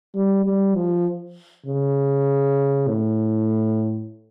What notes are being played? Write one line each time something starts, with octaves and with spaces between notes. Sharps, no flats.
G3
G3
F3
C#3
A2